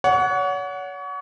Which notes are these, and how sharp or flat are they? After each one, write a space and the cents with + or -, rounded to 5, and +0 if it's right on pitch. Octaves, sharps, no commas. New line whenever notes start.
C#5 +35 F#5 -5